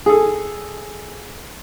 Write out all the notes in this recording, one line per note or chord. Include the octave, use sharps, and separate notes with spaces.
G#4 A4